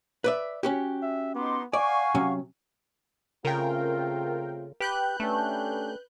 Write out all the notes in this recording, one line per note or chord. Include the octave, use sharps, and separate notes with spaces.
B4 D5 E5
C#4 F#4 G4
E5
B3 D#4 C6 D6
D5 F5 F#5 G#5 C#6
C3 F#3 C#4
C#3 A3 C4 F4 A#4 G5
G4 B4 F#6 G6
A3 C#4 D4 G4